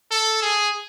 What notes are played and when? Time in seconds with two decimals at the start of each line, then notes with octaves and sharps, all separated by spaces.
0.11 A4
0.42 G#4